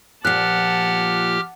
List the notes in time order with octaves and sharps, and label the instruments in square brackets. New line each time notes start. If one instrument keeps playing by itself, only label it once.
[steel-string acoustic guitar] A#2 F3 [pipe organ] G4 F6 [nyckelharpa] F#5 A5 [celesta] F#6